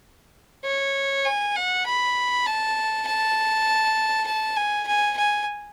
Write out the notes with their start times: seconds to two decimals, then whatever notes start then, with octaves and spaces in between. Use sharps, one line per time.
0.65 C#5
1.25 G#5
1.56 F#5
1.86 B5
2.46 A5
3.07 A5
4.27 A5
4.57 G#5
4.87 G#5
5.17 G#5